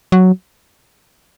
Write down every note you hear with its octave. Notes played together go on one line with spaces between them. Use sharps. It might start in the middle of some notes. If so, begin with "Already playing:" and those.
F#3